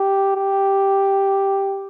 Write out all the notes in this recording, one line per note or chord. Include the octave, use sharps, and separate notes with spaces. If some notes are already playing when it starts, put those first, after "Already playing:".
Already playing: G4
G4